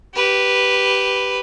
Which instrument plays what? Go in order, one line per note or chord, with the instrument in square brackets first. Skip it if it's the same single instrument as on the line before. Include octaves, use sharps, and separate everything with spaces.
[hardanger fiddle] G4 B4